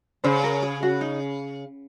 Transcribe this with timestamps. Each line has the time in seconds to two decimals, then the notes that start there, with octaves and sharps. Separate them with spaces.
0.24 C#3 C5
0.44 A#4
0.63 G#4
0.83 F#4
1.01 D#4